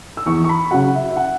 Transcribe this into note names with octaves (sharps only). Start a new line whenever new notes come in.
E6
E2 C#6
C#6
B5
C#3 F#3 F#5
E5
E5
F#5